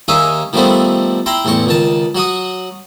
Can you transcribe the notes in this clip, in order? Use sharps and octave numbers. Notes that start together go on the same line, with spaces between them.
D#2 C#4 D#4 G#4 E5 F5
D#3 F3 G3 A3 B3 C4
E4 G5 A#5 C6
A1 E2 C4 C#6
C#2 D#3 A5
F#3 F#4 D#6